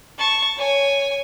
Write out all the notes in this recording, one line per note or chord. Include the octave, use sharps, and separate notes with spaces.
A5 C#6
C#5 G#5